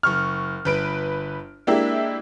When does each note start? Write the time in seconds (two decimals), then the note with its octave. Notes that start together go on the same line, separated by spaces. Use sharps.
0.03 F#1 C#6 F6
0.65 G1 B4 D7
1.67 G#3 A#3 D4 E4 G4 E5